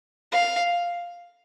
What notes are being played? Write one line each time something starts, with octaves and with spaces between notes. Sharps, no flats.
F5